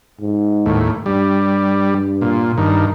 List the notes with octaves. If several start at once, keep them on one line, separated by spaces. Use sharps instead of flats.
G#2
D#2 A2
G2 G3
A#2
G2 D#3